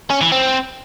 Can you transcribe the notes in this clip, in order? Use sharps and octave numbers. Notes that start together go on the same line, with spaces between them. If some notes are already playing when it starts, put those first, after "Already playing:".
C#4
E3
C4